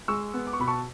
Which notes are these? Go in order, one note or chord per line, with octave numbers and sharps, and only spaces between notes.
G#3 C#6 E6
B3
D6
C#6
B2 B5
A5 C#6